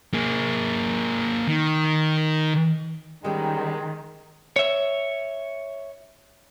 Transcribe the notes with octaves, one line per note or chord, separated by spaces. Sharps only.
A#3 G#4
D#3
D#3 G3 G#3 B3 C#4 G5
C#5 E5